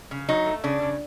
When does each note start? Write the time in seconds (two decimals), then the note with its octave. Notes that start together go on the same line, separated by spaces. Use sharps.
0.11 C#3
0.29 F#3 D#4
0.46 A3
0.64 C#3 D4
0.82 C#3